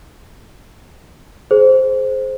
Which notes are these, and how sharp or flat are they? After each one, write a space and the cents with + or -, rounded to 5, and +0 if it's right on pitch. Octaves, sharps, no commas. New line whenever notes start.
G#4 +30 C5 +0